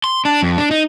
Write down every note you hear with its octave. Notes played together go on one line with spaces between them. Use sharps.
C6
D4
F2
D4
D#4